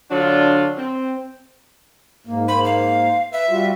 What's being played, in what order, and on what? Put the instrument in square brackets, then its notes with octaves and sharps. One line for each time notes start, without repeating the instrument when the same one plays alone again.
[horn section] D3 F#3 D4 F4
C4
[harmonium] G#2 A#3
[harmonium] G#2 A#3 C5 [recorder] B5
[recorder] F5
[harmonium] B4 [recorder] E5
[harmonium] G3 F4 F#4